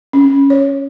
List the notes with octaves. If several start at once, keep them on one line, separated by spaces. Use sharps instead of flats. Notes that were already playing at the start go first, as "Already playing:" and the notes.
C#4
C#5